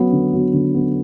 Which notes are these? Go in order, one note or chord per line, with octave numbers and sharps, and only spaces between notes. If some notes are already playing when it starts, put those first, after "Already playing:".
Already playing: F#3 B3
D3
F#3 B3
D3
F#3 B3